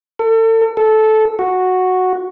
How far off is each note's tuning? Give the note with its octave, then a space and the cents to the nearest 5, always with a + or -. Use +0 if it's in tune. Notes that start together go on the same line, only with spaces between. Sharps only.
A4 +35
A4 -15
F#4 -5